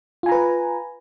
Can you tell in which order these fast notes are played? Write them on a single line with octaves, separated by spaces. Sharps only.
F4 G#5 A#5 B4